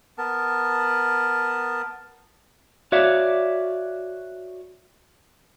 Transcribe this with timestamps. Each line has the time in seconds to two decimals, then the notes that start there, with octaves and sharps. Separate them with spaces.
0.18 B3 A#4 A5
2.92 F#4 C#5 D5 E5 F5